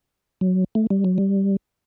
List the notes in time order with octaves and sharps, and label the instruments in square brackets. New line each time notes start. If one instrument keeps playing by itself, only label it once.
[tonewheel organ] F#3
A3
G3
F#3
G3